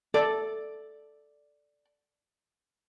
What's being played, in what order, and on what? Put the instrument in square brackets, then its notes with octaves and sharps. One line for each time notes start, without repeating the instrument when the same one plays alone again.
[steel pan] A4 [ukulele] D5